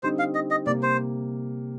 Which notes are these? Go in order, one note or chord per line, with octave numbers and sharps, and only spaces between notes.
D3 G3 C4 D#4 C5
F5
D#5
D#5
C3 G3 A#3 D5
C5